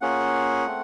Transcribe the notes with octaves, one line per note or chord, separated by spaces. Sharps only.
A#3 C#4 F4 G#4 F#5
A3 C4